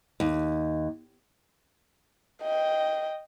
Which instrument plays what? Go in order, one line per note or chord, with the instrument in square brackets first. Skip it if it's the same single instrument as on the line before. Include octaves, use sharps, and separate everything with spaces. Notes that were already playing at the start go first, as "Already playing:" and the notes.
[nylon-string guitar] D#2
[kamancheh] D#5 G5